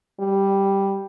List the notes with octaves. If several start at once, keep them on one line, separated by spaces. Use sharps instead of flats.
G3